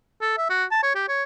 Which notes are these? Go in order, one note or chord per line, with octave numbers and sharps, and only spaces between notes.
A4
E5
F#4
A5
C#5
G4
C#5